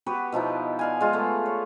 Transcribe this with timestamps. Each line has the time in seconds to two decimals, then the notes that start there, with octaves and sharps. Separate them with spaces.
0.06 B3 F#4 G4 B4
0.32 B2 F3 D#4 E4
0.79 D5 F5 G#5
1.01 G#3 F4
1.13 A3 B3
1.46 C#5